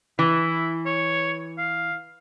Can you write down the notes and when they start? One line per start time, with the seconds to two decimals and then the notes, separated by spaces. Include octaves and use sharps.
0.19 E3 E4
0.86 C#5
1.58 F5